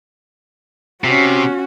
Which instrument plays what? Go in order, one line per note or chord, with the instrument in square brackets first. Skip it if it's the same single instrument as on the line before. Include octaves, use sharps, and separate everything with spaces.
[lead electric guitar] C3 [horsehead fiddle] C#4 F#4